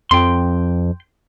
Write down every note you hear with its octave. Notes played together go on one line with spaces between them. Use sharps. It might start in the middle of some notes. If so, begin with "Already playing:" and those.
F2 G5 C6